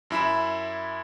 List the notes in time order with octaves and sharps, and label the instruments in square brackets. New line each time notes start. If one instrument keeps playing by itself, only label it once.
[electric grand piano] F#2 E4 B5 E7